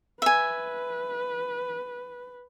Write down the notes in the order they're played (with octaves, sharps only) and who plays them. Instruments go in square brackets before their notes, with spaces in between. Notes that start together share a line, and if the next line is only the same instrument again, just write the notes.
[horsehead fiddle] B4 [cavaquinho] E5 G#5